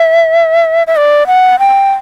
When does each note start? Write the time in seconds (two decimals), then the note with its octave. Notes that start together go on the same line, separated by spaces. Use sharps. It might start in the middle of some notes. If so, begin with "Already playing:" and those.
Already playing: E5
0.87 E5
0.96 D5
1.27 F#5
1.59 G5